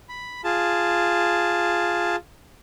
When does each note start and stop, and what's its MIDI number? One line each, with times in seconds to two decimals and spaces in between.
0.09 0.41 83
0.44 2.16 65
0.44 2.16 68
0.44 2.16 81